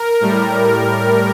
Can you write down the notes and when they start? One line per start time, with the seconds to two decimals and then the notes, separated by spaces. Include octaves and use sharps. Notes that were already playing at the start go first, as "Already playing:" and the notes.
Already playing: A#4
0.21 A2 G3